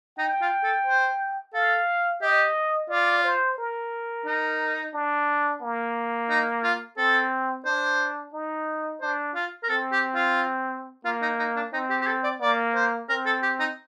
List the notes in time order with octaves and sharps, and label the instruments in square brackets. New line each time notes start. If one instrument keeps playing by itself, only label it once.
[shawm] D#4 [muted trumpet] G5
[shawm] F4
A4
C5
[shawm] A4 [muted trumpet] F5
[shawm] G4 [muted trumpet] D#5
[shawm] F4 [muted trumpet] D5
[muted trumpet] C5
A#4
[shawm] D#4
[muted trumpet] D4
A#3
[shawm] D#4
F4
[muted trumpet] C4 [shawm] A4
[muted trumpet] D4 [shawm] C5
[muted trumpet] D#4
[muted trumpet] D4 [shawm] C5
[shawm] F4
A#4
[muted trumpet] C4 [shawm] A4
[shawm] G4
F4
[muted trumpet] A#3 [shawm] F4
[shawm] D#4
D#4
D4
[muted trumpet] C4 [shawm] D#4
[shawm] G4
G4
A4
D5
[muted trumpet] A#3 [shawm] D5
[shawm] C5
[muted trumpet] C4 [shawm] A#4
[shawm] A4
G4
D#4